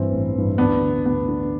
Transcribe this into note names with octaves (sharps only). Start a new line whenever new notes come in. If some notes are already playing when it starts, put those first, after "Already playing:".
Already playing: G2 E3 C4 E4
A1
G2 E3
D2 B3 D4
D3
D2 B3
D3